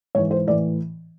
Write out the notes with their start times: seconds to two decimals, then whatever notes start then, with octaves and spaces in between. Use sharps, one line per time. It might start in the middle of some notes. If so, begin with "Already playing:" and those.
0.15 G#2 E3 C#5
0.31 C5
0.47 A2 E3 D5